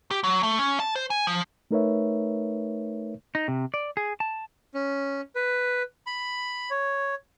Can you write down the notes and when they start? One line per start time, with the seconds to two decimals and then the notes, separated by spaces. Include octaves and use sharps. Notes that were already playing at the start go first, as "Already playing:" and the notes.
0.11 G4
0.24 F#3
0.43 A3
0.59 C#4
0.80 A5
0.96 C5
1.10 G#5
1.27 F3
1.71 A3 D#4 A#4 B4 C#5 E5
3.35 D#4
3.48 C3
3.74 D5
3.97 G#4
4.20 A5
4.74 C#4
5.35 B4
6.07 B5
6.70 C#5